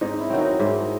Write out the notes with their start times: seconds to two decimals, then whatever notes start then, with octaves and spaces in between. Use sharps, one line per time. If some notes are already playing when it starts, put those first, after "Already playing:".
0.01 G#2 C4 D#4
0.20 C#4 E4
0.30 D#3 F#3 C4
0.40 D#4 F#4
0.59 G#2 E4 G#4